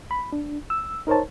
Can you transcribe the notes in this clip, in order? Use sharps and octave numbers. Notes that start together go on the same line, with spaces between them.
B5
D4
E6
D#4 A#4 C5 C#5 A5